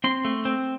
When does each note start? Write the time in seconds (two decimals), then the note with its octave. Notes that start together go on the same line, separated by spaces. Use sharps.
0.04 C4 C6
0.25 A3
0.45 C4